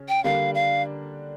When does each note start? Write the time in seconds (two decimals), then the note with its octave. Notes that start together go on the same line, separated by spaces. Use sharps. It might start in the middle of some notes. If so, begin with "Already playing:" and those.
Already playing: C#3 C#4
0.09 G5
0.24 D3 G3 A#3 D4 F5
0.55 F5